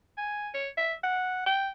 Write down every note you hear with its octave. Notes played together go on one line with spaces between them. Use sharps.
G#5
C#5
E5
F#5
G5